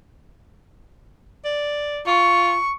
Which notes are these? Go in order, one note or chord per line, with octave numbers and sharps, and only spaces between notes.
D5
F4 C#6